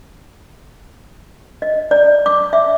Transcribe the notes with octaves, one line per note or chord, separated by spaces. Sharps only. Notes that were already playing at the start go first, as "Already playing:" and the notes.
D#5
D5
D6
E5